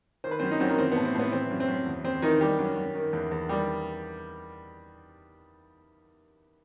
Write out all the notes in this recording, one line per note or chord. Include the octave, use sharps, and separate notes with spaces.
D#3 C5
B4
F#2 C4 C5
D#4
F#2 C4
D#3 D#4
E3 C4
A2 B3
C4
A2 B3
E3 C4
F#2
C4
F#2
E2
E2 C4
D#3 E3 D#4
D#3 G3 G4
F#2
F#2
D#3
E2
E2
D#3 G3 G4